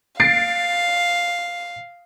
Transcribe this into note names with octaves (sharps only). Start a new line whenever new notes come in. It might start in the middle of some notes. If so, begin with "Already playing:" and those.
F5 A6 C7 D7